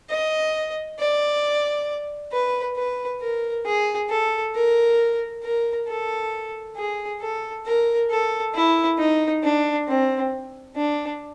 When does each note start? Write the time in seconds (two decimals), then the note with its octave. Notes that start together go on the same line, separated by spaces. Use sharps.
0.10 D#5
0.99 D5
2.32 B4
2.77 B4
3.21 A#4
3.66 G#4
4.09 A4
4.55 A#4
5.43 A#4
5.88 A4
6.77 G#4
7.21 A4
7.66 A#4
8.11 A4
8.55 E4
8.98 D#4
9.44 D4
9.88 C4
10.76 D4